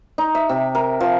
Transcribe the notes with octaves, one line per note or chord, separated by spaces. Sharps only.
D#4
E5
C3
A#4
F3